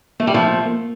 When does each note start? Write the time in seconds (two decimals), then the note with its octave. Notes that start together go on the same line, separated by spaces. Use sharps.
0.20 A3 A#3
0.27 G3
0.34 F3 A3
0.66 A#3